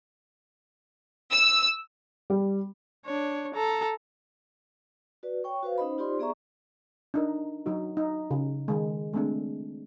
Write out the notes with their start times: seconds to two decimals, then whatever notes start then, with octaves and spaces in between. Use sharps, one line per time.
1.32 E6
2.30 G3
3.06 D4 C#5
3.55 A4 A#5
5.23 F#4 B4 D5
5.44 C#5 G5 C#6
5.63 F#4 B4 C5 F5
5.78 C#4 D#4 C5 D#5 B5
5.98 D#4 F4 G4 C5 D5 C6
6.19 B3 G#4 D5 E5 A#5 C#6
7.14 D4 D#4 A#4
7.66 F#3 D#4 F#4
7.97 D#4
8.31 C#3
8.68 D#3 G#3
9.13 G#3 A3 C4 D4